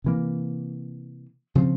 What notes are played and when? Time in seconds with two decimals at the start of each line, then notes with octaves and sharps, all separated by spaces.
0.04 C3 E3 A#3
1.55 C#3 F3 C4